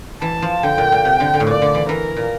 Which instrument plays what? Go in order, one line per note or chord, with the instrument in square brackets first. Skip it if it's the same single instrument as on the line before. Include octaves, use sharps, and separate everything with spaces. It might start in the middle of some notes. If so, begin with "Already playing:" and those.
[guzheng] E3 [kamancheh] A5
[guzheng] F3
[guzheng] D3 [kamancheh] G5
[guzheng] A#2
A#2
C3
D3
D3
A2
[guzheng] A#2 [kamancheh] D5
[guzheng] D3
E3
[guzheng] E3 [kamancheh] A#4
[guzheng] A#2